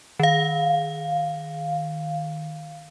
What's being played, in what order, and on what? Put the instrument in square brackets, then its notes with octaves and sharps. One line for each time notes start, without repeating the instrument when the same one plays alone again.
[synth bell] D#3 F5